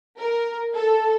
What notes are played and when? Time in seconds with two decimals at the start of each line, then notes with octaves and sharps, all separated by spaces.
0.18 A#4
0.74 A4